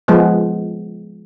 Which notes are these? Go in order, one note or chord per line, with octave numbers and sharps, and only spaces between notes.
F3 G#3 B3